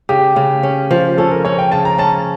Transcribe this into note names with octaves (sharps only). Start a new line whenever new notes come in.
C#3 G4
C#3
C#4
F3
C#4 A4
A#4
C#4 C#5
G5
C#3 A5
A#5
C#4 A5